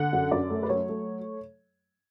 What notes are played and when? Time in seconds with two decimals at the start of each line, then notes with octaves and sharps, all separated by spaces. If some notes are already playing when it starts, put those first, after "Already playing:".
Already playing: D3 F#5
0.13 F#2
0.31 F#2 D5
0.50 A3
0.63 B4
0.69 F#3 C#5
0.89 A3